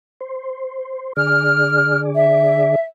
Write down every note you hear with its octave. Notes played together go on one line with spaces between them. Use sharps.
C5
D3 G#4 D5 F6
E5